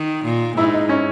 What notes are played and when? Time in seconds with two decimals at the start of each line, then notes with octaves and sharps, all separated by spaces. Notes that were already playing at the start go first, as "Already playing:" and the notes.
Already playing: D#3
0.25 A#2
0.57 G#2 E4
0.74 D#4
0.89 C#4